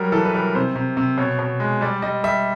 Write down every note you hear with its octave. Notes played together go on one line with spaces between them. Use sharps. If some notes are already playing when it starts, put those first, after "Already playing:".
Already playing: F#3 G3 A#4
E3 A4
B4
G3 A#4
C3 C5
C3
C3
B2 C#5
B2
G#3
G3 D5
G3 D#5
G3 E5